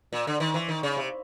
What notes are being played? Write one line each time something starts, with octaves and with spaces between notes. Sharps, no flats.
A#2
D3
D#3
E3
D#3
C#3
C3